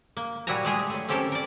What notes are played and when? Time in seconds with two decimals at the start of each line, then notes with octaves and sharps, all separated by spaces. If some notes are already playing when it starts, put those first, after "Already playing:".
0.17 A#3
0.47 A#2 G3 E4 F#4 G#5 A#5
0.65 G#3 A3 G4 G#4 D#5 E5
0.90 F#3 A3
1.09 C4 C#4 G4 A4 A#4 C5
1.32 A#4 D5